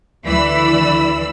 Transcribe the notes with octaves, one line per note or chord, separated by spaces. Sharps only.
D2 E3 D5 B5 E6